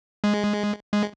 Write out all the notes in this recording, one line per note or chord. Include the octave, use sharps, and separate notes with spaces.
G#3
G#3